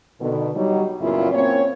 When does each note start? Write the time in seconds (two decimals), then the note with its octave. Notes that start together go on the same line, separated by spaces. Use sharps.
0.20 B2 D3 D#3
0.55 F#3 G3 D#4
1.01 F#2 A#2 C#3 B3 E4 F4
1.32 A#3 C4 C#4 C#5